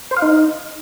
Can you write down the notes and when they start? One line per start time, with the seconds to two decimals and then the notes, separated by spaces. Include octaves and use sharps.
0.11 C5
0.17 F5
0.22 D#4